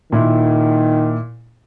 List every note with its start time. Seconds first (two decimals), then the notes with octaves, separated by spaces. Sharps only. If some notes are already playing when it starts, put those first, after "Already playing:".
0.12 A#2 D#3 E4